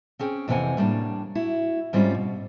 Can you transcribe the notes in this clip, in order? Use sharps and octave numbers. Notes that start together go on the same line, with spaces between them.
C4 C#4 G#4 G5
F2 C3 E3 C4 F#5 G#5
A2 G3 A#3 C4 D4
E4 F#4
G#2 G3 C4 C#4 E4 F4
B2